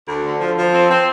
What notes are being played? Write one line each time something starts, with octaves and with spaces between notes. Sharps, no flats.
D2
D3
F3
F3
C4
C4